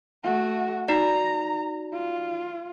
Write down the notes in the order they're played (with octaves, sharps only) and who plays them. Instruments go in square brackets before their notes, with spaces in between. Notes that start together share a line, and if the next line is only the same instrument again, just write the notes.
[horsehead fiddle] A3 F#4
[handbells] D#4 F#4 D5 [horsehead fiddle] A#5
[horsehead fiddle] F4